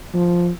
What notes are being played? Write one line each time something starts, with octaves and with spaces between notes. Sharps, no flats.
F3